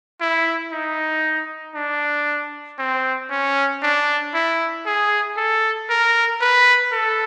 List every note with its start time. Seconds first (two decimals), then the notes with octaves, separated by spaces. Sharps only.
0.20 E4
0.72 D#4
1.74 D4
2.78 C4
3.30 C#4
3.82 D4
4.34 E4
4.85 G#4
5.36 A4
5.89 A#4
6.41 B4
6.92 A4